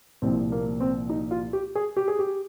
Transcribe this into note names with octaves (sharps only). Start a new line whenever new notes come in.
C2 A#2 F3 C4
A#3
C4
D#4
F4
G4
G#4
G4
G#4
G4